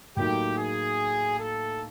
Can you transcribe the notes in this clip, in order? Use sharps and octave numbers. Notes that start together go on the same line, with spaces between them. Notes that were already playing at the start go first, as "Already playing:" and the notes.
A2 F#3 A#3 D#4 G4
G#4
A4